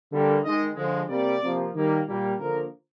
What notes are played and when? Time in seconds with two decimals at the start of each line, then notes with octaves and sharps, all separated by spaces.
0.12 D3 G3 A#3
0.44 D#3 G#3 D#5
0.76 D3 F3 G#3
1.09 C3 G3 A#3 D5
1.41 C3 F3 A#3
1.74 D#3 G3 A#3
2.07 A#2 G3 A#3
2.39 D3 F3 A#3 A#4